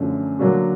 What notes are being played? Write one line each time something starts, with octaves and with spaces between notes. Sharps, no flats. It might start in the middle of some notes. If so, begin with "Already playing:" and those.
Already playing: F#2 D3 F3 A3
D3 F#3 A#3 D4 F#4